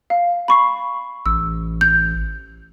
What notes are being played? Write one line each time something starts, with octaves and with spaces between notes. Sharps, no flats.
F5
B5 C#6 C7
A1 E6
G6